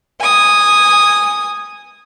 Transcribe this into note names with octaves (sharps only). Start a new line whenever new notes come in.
G#5 D#6